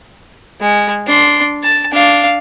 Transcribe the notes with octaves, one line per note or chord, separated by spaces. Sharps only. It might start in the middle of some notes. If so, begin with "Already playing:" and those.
G#3
D4 C6
A5
D4 F5